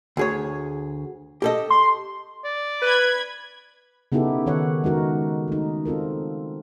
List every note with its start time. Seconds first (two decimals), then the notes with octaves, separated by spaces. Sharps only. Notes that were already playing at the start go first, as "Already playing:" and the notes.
0.17 D2 G#4 C#5
1.42 G4 A4 D#5
1.70 C6
2.45 D5
2.82 B4 B5 G#6
4.12 C#3 B3 D#4 E4 G4 A4
4.46 D#3 A4 C#5 F#5
4.84 G#3 D#4 F#4 A#4
5.48 A3 D#4
5.85 C4 F4 A4 A#4